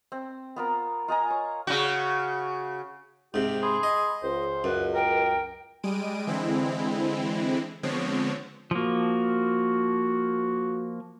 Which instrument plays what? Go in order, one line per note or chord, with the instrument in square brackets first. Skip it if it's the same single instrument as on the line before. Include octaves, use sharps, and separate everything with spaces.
[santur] C4
B3 F4 A#4
F4 D#5 G#5 A#5
C#5
[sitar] C#3 F#4
[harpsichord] G#2 C3 [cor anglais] G4
[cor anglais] G#4 [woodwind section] B5 C6
[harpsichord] D#5
[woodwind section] C#2 [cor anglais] C5
[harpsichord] F#2 [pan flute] B4
[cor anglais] A#4 [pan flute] G5
[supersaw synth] G3 G#3 D7 D#7
D3 E3 G#3 C4 E4
D3 F3 G#3 B3 C4 C#5
[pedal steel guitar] F3 A#3 [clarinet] F#4